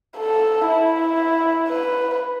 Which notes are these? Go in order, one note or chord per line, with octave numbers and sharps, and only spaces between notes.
A4
E4
B4